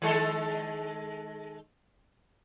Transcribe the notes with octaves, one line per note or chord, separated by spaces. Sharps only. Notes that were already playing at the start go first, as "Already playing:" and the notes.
D#3 G#3 A4